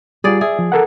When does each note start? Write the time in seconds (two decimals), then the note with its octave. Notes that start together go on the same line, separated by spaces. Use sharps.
0.24 G3 F4 G#4 D5
0.41 G#4 E5
0.59 F3
0.72 A4 A#4 F#5